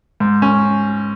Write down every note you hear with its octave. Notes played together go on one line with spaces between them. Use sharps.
G#2
C#4